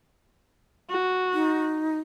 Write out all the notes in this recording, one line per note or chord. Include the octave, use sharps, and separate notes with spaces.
F#4
D#4